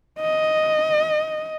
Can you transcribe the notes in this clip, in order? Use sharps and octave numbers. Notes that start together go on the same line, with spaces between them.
D#5